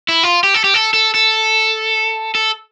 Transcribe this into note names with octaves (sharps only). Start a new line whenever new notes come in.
E4
F4
G4
A4
G4
A4
A4
A4
A4